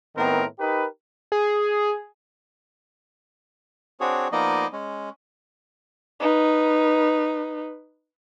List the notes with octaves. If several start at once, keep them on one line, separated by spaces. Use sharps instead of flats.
A2 D#3 B3 C4 A#4
D#4 G4 A#4 B4
G#4
C4 D4 F#4 G#4 C#5
F3 A#3 B3 D#4 D5 D#5
G#3 C#4
D#4 B4